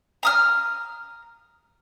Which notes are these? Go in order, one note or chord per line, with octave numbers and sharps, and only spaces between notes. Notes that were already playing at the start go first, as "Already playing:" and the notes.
A#5 D#6 F6